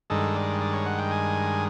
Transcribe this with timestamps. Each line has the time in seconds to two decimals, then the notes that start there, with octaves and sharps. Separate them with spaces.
0.10 G2 D#3 G#3 A4
0.36 D5
0.61 D5
0.74 C#5
0.86 F#5
0.98 G5
1.11 G#5